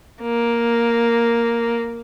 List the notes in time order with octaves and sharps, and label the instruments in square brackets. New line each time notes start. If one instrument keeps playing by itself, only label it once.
[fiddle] A#3